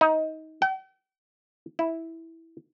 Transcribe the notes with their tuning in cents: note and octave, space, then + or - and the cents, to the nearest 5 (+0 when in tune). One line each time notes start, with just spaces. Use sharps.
D#4 +20
G5 -45
E4 -5